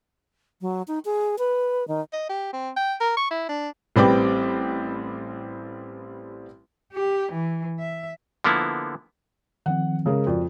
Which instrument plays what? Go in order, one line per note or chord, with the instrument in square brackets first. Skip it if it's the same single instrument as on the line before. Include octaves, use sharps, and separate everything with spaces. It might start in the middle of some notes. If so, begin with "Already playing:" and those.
[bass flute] F#3
D#4
G#4
B4
D#3
[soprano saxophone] D#5
G4
C4
G5
A#4
C#6
E4
D4
[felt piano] A1 G3 C4 B4 G5 D6
[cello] G4
E3
E5
[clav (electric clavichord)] D3 F3 A#3 B3 E4
[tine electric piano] D#3 F3 C4 [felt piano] F#5
[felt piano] C#3 G#3 A#4
[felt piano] F2 [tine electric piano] F#4 D5